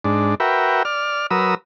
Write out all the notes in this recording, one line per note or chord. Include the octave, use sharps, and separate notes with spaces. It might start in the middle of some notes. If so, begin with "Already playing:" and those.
G#2 D4
F#4 A#4 B4 E5 G5
D5 F6
F#3 A#4 B4 D#6 E6